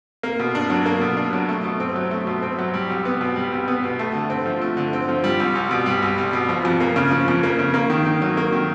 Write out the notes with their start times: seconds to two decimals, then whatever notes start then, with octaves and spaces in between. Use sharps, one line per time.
0.23 A#3
0.39 B2
0.55 D4
0.70 F#3
0.86 A#3
1.01 B2
1.17 D4
1.33 F#3
1.49 A3
1.64 B2
1.80 C4
1.96 F#3
2.11 A3
2.27 B2
2.42 C4
2.59 F#3
2.74 G3
2.90 C2
3.05 B3
3.21 B2
3.36 G3
3.52 C2
3.68 B3
3.84 B2
3.99 A3
4.14 D3
4.30 C4
4.46 F3
4.61 A3
4.77 D3
4.93 C4
5.09 F3
5.24 G3
5.40 C2
5.55 C2
5.71 B2
5.86 G3
6.02 C2
6.18 C2
6.33 B2
6.49 F3
6.65 F2
6.80 A#3
6.96 C#3
7.11 F3
7.28 F2
7.43 A#3
7.59 C#3
7.74 A#3
7.90 D#3
8.06 D#3
8.22 F#3
8.37 A#3
8.53 D#3